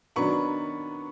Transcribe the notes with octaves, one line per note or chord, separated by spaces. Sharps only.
D#3 F#3 B3 D4 B5 C#6